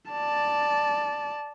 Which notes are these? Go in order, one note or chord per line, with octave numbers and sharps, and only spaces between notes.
D5 A5